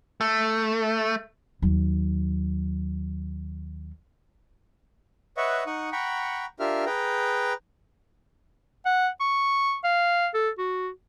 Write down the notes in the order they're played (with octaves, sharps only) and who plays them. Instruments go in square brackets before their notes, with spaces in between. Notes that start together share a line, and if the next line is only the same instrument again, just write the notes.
[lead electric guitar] A3
[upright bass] D#2 F#3
[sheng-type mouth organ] B4 C#5 D#5 E5 F#5 C#6
D#4 F#5 C#6 D#6
F#5 G5 A#5 B5 C#6
D4 F4 G4 A#4 E5 F6
G#4 B4 G5 A#5
[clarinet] F#5
C#6
F5
A4
F#4